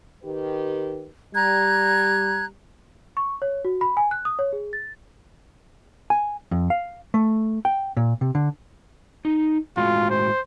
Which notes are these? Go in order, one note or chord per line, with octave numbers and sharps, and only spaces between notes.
D#3 G4 B4
G3 A#5 F#6 G#6
C#6
C#5
F#4
B5
G#5
F#6
D#6
C#5
G#4
A6
G#5
F2
F5
A3
G5
A#2
C3
D3
D#4
A2 G#3 F4 F#4
C5